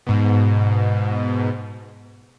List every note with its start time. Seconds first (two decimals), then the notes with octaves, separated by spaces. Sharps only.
0.07 G#2 B2